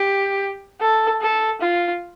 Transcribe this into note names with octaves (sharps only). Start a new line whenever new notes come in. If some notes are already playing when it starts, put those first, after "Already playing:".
Already playing: G4
A4
A4
F4